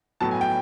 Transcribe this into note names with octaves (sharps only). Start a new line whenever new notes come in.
A2 F#3 B3 A5
G#5
G5